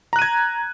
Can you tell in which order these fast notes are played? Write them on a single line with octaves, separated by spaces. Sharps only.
A#5 F#6 D#7 G#6